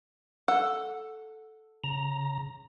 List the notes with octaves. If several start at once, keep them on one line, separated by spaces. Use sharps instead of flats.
A4 F#5
C#3 A#5